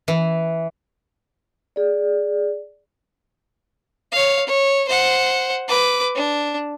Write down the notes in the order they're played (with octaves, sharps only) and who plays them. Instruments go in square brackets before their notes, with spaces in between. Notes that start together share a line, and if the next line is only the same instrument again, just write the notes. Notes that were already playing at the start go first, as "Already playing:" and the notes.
[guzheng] E3
[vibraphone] G#4 D5
[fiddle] C#5 F5
C#5
C5 F#5
B4 D6
D4